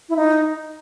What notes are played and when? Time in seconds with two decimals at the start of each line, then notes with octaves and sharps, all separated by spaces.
0.09 E4
0.16 D#4